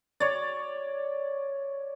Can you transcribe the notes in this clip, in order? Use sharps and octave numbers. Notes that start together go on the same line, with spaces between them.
C#5 D5